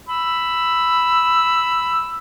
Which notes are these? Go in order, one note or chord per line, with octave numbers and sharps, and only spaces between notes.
B5 E6